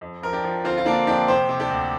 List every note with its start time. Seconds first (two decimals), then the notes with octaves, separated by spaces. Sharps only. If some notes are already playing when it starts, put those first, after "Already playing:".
0.01 F2
0.22 F3 A#4
0.33 D4 G4
0.44 F3
0.64 D3 C4 F4
0.78 F4
0.85 D3 A#3 D4
1.07 F2 D4 G4
1.28 C3 G4 C5
1.49 C3
1.60 D4 G4
1.70 D2